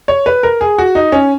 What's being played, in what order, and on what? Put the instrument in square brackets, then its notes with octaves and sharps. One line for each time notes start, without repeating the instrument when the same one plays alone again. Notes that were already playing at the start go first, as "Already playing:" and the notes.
[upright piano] C#5
B4
A#4
G#4
F#4
D#4
C#4